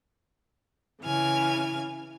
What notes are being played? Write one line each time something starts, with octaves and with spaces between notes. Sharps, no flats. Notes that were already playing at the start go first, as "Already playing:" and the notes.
C#3 E3 G#5 F6